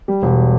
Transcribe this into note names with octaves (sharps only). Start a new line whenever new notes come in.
G3
E1